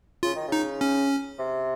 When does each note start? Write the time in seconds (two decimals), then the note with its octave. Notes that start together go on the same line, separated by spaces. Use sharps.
0.23 C#3 F4
0.35 D#3
0.48 C#3 D#4
0.81 C#4
1.39 C3